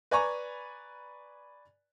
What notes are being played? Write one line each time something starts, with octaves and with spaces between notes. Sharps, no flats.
B4 D5 G#5 A#5 B5 C#6